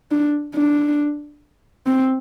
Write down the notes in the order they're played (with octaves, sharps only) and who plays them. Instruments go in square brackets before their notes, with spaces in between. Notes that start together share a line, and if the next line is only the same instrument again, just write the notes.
[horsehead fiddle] D4
D4
C4